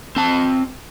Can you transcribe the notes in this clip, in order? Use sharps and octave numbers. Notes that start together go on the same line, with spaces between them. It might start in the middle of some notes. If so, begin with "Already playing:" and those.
C4 A5